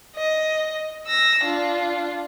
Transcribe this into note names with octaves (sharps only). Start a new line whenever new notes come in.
D#5
E6 A#6
D4 F4